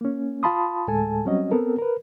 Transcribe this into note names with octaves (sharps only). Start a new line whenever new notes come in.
A#3 C#4
F4 F5 A5 B5 C6 D#6
D2 A2 G#3 A4 G#5 A5
F#3 G3 C4 C#4 F#4 D#5
B3 C4 A4 A#4
A#4 B4